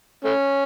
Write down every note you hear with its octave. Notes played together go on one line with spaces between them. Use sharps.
A3 C#4